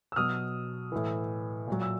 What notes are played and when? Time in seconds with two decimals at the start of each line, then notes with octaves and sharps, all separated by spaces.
0.12 E6
0.16 B2 F#3 D#6 F6
0.92 A2 E3
1.67 A#2 F#3
1.82 E6